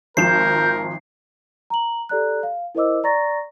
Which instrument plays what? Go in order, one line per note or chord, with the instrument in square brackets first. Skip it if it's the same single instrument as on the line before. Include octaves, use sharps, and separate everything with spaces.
[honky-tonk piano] G#1 F3 E7 [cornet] A#4 [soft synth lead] G6 [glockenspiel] C7
[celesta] A#5 F#7
G4 A4 D5 A#5 F#6
F5
E4 A#4 C5 D#5 D6 E6
D5 A#5 C#6 A6 A#6